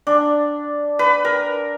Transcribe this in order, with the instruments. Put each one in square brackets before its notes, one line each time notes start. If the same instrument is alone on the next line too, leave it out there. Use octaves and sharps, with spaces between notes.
[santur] D4
B4
A#4